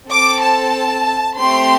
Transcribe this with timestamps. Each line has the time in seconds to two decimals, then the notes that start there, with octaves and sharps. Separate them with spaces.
0.11 C4 A4 D6
0.43 A5
1.39 A3 C4 G4 C6